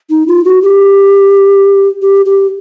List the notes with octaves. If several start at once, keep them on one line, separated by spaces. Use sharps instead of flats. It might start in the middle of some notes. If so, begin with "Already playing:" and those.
D#4
F4
F#4
G4
G4
G4